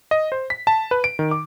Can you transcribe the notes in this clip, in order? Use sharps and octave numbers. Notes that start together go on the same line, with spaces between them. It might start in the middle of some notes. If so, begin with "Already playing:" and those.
D#5
C5
B6
A5
B4
D7
D#3
D6